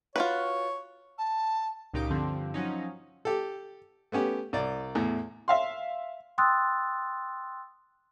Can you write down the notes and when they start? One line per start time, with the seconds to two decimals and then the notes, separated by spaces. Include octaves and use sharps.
0.16 F4 F#4 B4 C#5
1.18 A5
1.94 C#2 A#2 D#4 G4 D6
2.10 G2 D3 F3 C4
2.54 F3 F#3 C#4 D#4
3.25 G4 A4
4.12 A3 B3 C#4 G4
4.53 C2 D5
4.95 E2 A2
5.48 E5 F5 C6
6.38 G5 C6 D#6 E6 F#6 A6